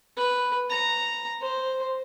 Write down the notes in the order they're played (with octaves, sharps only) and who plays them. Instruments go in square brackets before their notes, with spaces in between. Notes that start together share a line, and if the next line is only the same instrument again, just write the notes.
[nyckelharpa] B4
A#5
C5